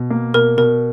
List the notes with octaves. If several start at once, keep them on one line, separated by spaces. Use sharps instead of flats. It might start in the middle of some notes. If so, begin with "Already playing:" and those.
Already playing: B2
A#3
B2 A#4
B2 A#4